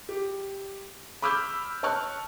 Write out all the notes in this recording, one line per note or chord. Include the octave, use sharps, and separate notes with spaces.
G4
B5 D6 E6 F6 G6
C#5 A5 C#6 F6 F#6